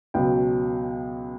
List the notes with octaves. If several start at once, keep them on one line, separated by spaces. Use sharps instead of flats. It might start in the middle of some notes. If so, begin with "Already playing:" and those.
C#2 B2 F#3 G5